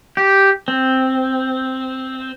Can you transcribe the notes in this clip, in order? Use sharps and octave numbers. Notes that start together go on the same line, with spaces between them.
G4
C4